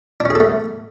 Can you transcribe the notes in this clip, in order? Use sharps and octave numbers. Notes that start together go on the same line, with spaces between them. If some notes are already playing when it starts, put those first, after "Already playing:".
A3 C#4 D4 G#4 A4